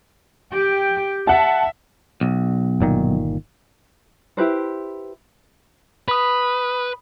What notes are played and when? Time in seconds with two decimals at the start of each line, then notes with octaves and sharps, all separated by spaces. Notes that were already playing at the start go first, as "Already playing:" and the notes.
0.53 G4 G5
1.27 E5 F#5 A5
2.21 B1
2.80 G1 A#2 D#3
4.37 E4 G4 B4 C5
6.08 B4 B5 D#6